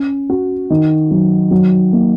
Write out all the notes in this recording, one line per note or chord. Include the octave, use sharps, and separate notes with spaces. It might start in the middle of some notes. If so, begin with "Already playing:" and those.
Already playing: C#4
F#4
D#3
F#3
F#3
A#3